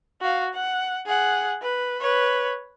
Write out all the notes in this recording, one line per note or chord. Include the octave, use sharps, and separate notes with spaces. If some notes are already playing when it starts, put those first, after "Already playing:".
F#4 F5
F#5
G#4 F#5
B4
B4 C#5